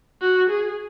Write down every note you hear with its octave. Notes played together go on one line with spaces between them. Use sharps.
F#4
G#4